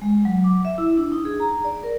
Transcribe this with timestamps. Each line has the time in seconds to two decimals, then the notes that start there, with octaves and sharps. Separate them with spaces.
0.02 G#3
0.25 F#3
0.44 D6
0.65 E5
0.78 E4
0.97 D4
1.12 D#4
1.25 G#4
1.40 A#5
1.65 D5
1.83 A#4